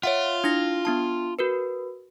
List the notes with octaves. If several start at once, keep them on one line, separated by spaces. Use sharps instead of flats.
F4 C#5 E5 F#5
D4 E4 A#6
B3 D4 A5
F#4 A#4 B4